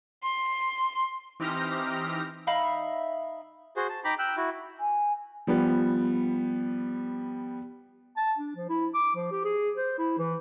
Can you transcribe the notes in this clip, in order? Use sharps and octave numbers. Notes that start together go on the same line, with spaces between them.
C6
E3 C4 D#4 G4 F6 A#6
D#4 E5 F5 B5
F#4 G#4 C5
A5
D#4 G5 A#5 B5 D6
G5 E6 F#6
E4 F#4
G#5
F3 G3 B3
A5
D4
F3
E4
D6
F3
G4
G#4
C5
E4
E3